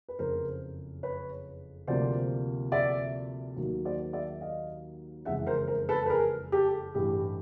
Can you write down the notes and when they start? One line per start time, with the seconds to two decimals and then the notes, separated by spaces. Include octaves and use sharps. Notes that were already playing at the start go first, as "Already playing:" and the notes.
0.08 B4
0.19 F#1 F2 C#3 A#4 C5
1.03 B4 C#5
1.87 D2 C3 F3 A#3 C5 D5
2.72 D5 E5
3.56 D#2 D#3 F#3 A#3
3.85 C5 D5
4.13 D5 E5
4.41 D#5 F5
5.25 F#1 F2 C#3 E3 G#3 E5 F#5
5.46 A#4 C5
5.68 A#4 C5
5.89 A4 B4
6.06 B4
6.10 G#4 A#4
6.52 G4 A4
6.95 A1 G2 E3 A3 G4